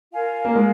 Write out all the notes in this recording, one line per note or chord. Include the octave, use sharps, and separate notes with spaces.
F4 A#4 F5 G#5
A#3
G#3 F4 A#4 F5 G#5